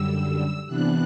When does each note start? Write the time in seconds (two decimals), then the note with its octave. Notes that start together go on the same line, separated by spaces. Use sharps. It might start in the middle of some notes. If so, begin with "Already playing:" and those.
Already playing: F#2 D3 G3 E6
0.67 C3 E3 B3 D4 F#6